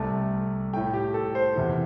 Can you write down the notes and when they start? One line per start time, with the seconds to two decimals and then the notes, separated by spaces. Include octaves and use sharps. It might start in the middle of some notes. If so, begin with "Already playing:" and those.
Already playing: C2 C3 A3 A5
0.73 A2 A3 G5
0.94 G4
1.14 A4
1.35 C5
1.56 E2 C3 E3